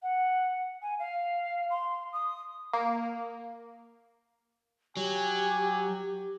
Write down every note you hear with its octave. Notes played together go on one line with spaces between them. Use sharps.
F#5
G#5
F5
C6
D#6
A#3
F#3 G4 G#5